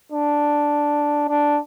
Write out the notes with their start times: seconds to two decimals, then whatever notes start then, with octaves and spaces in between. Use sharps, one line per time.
0.12 D4
1.29 D4